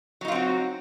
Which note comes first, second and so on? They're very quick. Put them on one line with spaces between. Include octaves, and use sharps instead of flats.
F#3 D#4 F4 C4 F#4